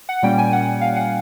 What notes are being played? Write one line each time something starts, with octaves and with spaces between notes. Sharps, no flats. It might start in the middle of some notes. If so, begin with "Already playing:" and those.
F#5
A#2 G3 A#3 C#4 G5
G#5
F#5
F5
F#5